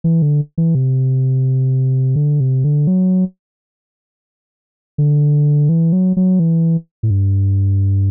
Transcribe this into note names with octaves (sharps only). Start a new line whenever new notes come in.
E3
D3
E3
C3
D3
C3
D3
F#3
D3
E3
F#3
F#3
E3
A2
G2